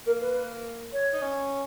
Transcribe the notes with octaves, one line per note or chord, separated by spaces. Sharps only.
A#3 A#4
B4
C#5
D#4
C#4